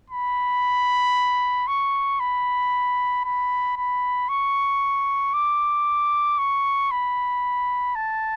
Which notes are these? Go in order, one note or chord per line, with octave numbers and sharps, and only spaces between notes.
B5
C#6
B5
B5
B5
C#6
D6
C#6
B5
A5